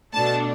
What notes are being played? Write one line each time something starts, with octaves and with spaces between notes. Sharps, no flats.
B2 A3 D4 A5